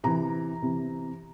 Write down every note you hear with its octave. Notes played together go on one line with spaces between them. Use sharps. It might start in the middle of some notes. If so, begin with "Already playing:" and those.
C3 E3 A#5
C3 E3